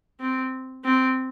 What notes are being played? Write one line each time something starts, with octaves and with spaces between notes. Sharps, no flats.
C4
C4